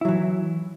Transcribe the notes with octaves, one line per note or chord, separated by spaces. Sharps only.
E3 F#3 E4